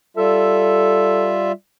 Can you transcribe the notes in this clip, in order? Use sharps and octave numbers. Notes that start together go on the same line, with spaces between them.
G3 F4 A4 E5